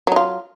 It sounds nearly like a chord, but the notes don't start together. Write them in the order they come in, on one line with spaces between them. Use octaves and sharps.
F#3 D#4 F4